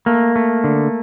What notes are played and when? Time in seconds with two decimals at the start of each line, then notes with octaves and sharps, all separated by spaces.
0.06 A3 A#3
0.36 A3
0.64 D3